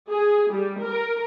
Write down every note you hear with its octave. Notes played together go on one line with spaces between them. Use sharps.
G#4
G3
A#4